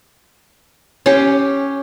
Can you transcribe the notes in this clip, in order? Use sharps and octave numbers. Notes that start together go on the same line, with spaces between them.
C#4 G4